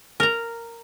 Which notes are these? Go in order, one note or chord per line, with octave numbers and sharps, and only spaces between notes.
A#4 A#5